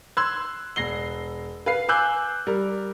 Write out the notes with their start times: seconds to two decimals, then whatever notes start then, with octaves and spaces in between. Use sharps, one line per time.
0.17 C6 E6 F#6 G#6
0.76 E1 A#6 C7 G7
1.66 B4 F5 C7
1.89 G#5 D6 E6 F#6 G6
2.47 G3 A#4